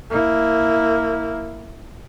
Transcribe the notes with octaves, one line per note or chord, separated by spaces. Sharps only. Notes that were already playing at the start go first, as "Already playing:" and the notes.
A#3 E4